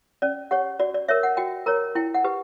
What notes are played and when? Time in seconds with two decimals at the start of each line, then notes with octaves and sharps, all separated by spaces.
0.22 C#4 D5
0.51 G4 C#5 F#5
0.80 F#4 D5
0.94 D5
1.08 A#4 C#5 E5
1.23 F#5
1.37 F#4 G5
1.66 A#4 C#5 A#5
1.95 E4 G5
2.14 F#5
2.24 G4 B4